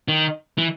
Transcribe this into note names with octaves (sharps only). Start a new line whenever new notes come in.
D#3
E3